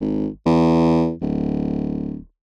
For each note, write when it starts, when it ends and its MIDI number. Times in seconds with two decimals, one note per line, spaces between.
0.01 0.28 32
0.46 1.13 40
1.22 2.20 26